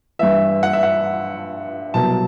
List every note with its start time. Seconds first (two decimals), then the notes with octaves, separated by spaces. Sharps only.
0.19 G2 E3 E5
0.63 F#5
0.73 E5
0.83 F#5
1.94 C2 B2 F#3 A5